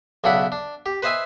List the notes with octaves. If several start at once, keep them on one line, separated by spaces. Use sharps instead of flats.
B1 C#3 D4 E4 F#5 B5
D4
G4
B4 C5 D#5 E5 G#5